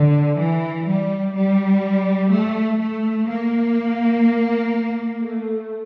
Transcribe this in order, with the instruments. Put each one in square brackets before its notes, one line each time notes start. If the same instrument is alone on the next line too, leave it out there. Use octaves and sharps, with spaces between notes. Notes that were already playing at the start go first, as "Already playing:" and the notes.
Already playing: [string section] D3
E3
G3
G3
A3
A3
A#3
A3